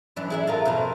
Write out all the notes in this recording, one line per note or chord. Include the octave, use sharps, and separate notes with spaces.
F#2 E3 D4
E4 G#4 E5
F4 A4 A#4
F2 B2 A#4